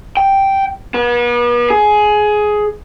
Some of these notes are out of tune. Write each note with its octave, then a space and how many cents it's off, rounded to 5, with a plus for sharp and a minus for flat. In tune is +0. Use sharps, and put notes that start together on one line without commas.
G5 -5
B3 -40
G#4 +15